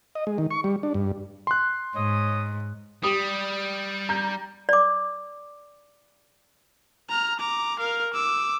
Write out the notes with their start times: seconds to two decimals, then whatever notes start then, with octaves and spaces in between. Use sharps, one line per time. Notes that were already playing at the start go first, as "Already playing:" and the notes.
0.15 D#5
0.27 G#3
0.38 D#3
0.51 C#6
0.64 G3
0.83 D4
0.94 G2
1.47 C6 F#6
1.96 G#2 C#5 D#5 D#6
3.03 G3 G4 D#6
4.09 A#5 G6
4.69 D5 D6
7.09 A#5 F6
7.39 A#5 D6
7.79 A#4 F5
8.14 D6 E6